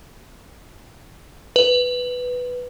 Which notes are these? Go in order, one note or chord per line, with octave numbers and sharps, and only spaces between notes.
B4